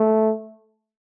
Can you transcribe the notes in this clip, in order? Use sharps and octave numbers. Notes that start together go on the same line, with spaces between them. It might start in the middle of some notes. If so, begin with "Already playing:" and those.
Already playing: A3